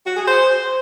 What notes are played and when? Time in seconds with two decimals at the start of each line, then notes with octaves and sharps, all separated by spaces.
0.06 F#4
0.17 G#4
0.27 C5